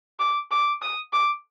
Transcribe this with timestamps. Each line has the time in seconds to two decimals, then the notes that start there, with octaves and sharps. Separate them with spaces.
0.19 D6
0.51 D6
0.82 D#6
1.13 D6